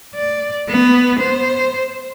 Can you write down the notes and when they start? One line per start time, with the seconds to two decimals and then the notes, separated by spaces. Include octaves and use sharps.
0.15 D5
0.68 B3
1.19 C5